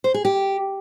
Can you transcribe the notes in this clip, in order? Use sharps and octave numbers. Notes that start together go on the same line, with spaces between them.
C5
G#4
G4